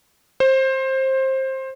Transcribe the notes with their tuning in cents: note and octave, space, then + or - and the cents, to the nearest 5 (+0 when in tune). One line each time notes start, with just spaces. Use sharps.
C5 +20